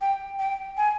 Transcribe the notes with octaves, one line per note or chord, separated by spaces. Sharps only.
G5
G5
G#5